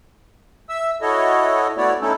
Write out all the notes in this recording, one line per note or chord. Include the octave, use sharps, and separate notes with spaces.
E5 E6
E4 F#4 A4 C#5 D#5
A3 B3 E4 F#4 C#5 D5
A3 C#4 D#4 E4 A4